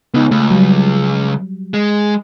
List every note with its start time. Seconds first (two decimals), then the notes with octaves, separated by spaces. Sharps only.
0.14 C#2 B3 D#4
0.31 C#2 A3
0.51 F#3 G3
1.74 G#3